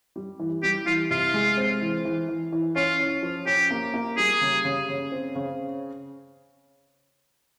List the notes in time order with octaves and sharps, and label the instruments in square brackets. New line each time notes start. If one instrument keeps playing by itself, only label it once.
[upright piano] G3
E3
[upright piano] G3 [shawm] G4
[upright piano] E3 [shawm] F4
[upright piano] C3 [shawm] F4
[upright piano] G#3
C4
E3
E3
E3
E3
[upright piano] C#4 [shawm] F4
[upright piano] C#4
F3
[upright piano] C#4 [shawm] G4
[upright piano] A#3
A#3
[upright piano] G3 [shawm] G#4
[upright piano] C#3
C#3
C#3
C4
C#3